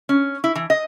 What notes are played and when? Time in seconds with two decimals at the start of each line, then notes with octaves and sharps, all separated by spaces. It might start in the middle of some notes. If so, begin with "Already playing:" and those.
0.09 C#4
0.44 E4
0.55 E3
0.70 D#5